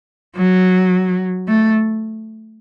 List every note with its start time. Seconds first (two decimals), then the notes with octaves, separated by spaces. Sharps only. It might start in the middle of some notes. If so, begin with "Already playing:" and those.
0.36 F#3
1.48 A3